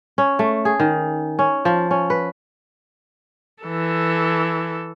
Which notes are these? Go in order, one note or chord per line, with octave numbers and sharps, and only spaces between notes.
C#4
A3
G#4
D#3
C#4
F3
C#4
B4
E3 A4